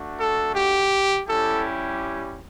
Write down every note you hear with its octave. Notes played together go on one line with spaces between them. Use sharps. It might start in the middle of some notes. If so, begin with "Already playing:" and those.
Already playing: A3 D4 F#4
A4
G4
G3 C#4 E4 G4 A4